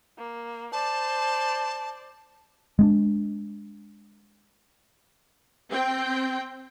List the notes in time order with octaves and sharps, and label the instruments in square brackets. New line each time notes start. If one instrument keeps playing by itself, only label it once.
[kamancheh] A#3
[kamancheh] C5 D5 [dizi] A5
[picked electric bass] G#3 B3 D4
[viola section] C4 G5